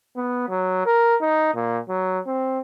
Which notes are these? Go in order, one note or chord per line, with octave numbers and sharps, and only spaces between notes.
B3
F#3
A#4
D#4
A#2
F#3
C4